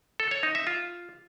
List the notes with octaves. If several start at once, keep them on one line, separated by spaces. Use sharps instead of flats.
A4
C#5
D#4
E5
F4